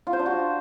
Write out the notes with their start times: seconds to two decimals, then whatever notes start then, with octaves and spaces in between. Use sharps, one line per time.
0.07 F4
0.13 C5
0.19 D4
0.26 F#4